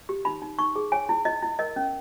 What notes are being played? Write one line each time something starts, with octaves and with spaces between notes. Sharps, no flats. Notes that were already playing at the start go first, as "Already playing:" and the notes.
G4
D#4 B5
D#4
D#4 C#6
G#4
C#5 G#5
E4
E4 D#5
E4
A#4 D#5
C#4